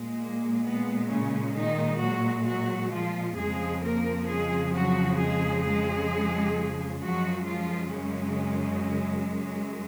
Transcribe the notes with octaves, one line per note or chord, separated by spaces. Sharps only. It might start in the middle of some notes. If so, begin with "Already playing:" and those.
Already playing: A#2 G#3
A#3
B3
C#3 C#4
D#3 D#4
F#3 F#4
F#3 F#4
F3 F4
F2 C#3 F3 G#3 G#4
A#3 A#4
G#3 G#4
F#3 F#4
G#3 G#4
G#3 G#4
F#2 F3 F#3 G#3 F#4
F3 F4
C#3 C#4